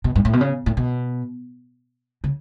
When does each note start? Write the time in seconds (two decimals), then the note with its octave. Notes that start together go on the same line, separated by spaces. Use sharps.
0.04 B2
0.16 G2
0.25 A2
0.33 B2
0.41 C#3
0.66 A2
0.77 B2
2.24 C#3